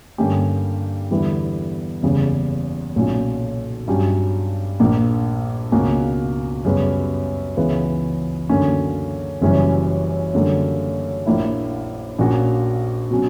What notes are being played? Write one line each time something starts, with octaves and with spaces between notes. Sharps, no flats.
G2 D3 A#3 C#4 G4
E2 D3 G3 B3 E4
F#1 E2 C#3 G3
B1 A#2 F#3 C#4
G2 F#3 C#4 G4
A#1 A#2 A#3
C#2 B2 A#3 C#4 F#4
F#2 C#3 G3 B3 F#4
C#2 C#3 E3 B3
F#2 D3 A#3 C#4
F#1 F#2 E3 G3 C#4
F#2 D3 G3 A#3
A#1 A#2 A#3 E4
A#1 A#2 A#3 C#4 F#4
B2 F#3 C#4